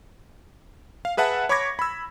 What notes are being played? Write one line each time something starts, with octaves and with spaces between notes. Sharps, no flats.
F5
G#4 B4 E5 F#5 A5
C#5 B5 C#6 D6 G#6 A#6
B5 E6